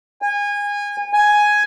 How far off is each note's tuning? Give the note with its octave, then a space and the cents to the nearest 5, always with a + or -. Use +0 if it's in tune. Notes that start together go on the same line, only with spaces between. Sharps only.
G#5 -25
G#5 +5